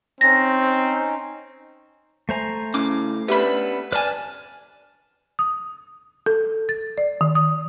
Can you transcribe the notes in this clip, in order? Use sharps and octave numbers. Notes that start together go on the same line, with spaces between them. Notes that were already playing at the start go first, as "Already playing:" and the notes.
C4 C#4 D#4 A#6
A3 C5 E5 G#5 A#5
A2 C#3 C#4 D6
B3 C#4 D4 G4 B4 E5 B5
B4 D5 G#5 A5 F6
D#6
A4
A6
D5
D#3
D#6